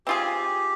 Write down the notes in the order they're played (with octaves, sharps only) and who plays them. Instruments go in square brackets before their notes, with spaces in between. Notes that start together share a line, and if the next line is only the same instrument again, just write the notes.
[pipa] C4 F4 G#4 [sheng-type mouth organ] G4